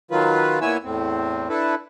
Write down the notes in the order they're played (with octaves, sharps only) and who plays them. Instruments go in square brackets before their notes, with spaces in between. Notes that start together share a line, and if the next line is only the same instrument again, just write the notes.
[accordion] D#3 F#3 F4 B4
A#2 B3 E4 C#5 G#5 E6
E2 A2 C4
D4 E4 A4 B4